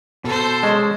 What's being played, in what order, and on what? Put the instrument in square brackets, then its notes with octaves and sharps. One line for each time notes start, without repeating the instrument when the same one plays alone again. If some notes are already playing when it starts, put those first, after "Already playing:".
[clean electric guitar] B2 [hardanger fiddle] A4 C5
[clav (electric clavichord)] G#3 C#4 [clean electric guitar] A5 C6